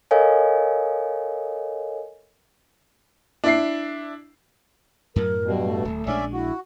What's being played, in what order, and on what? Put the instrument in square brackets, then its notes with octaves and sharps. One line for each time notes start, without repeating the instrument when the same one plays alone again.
[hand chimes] A4 A#4 C#5 D#5 F5 G#5
[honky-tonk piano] D4 E4 C7
[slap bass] F#2 A2 F#3 [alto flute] A#4
[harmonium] G2 B2
[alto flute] A3
[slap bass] D1
[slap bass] A#1 G#3 D4 [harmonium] C#4 D5 E5
[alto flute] E4 [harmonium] F#4